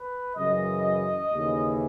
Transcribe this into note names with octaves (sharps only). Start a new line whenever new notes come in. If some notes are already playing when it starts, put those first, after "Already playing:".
Already playing: B4
F#2 C#3 E3 D#5
D#2 C#3 E3